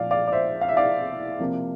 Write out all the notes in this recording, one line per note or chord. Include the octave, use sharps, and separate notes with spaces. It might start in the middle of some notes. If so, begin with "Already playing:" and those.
Already playing: A#2 F3 A3 D5 F5
D5 F5
D5
C5 E5
F5
E5
D5 F5
C3 F3 A#3